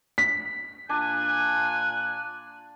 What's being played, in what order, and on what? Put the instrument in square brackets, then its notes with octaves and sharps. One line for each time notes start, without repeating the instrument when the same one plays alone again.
[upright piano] B6
[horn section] A#2 F4 G#5 [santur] D4 [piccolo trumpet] F#6